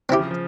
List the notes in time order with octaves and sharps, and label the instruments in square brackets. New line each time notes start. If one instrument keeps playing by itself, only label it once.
[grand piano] C#3 [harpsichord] C4 E4 G4
[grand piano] F3
F3